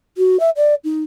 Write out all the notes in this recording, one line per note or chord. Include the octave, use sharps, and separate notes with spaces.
F#4
E5
D5
D#4